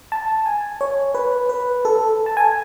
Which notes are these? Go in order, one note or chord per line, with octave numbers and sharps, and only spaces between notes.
A5
G#5
C#5
B4
B4
A4
A5
G#5